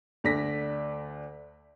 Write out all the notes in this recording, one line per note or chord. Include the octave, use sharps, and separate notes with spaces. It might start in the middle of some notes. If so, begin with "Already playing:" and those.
D2 A3 D4 D5 A#6 B6